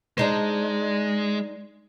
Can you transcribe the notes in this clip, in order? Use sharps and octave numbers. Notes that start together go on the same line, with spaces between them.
G#3 D4 D#4 C5